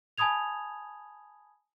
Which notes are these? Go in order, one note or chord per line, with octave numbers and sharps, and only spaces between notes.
G#5 A5 B5 D#6 G#6 F7